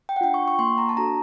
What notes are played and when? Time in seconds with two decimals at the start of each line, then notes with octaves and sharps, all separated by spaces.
0.09 G5
0.16 F#5
0.21 D4 F4 G5
0.34 C#6
0.48 C#6
0.59 A#3 C6
0.78 A#5
0.89 A5
0.97 D4 F#4 A4 A#5